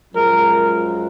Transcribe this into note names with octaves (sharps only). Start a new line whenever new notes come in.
F#2 F3 G#3 A#4